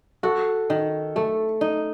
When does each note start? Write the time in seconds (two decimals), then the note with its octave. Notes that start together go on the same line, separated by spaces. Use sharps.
0.23 F#4 A4
0.70 D#3
1.16 A3 A4
1.61 D#4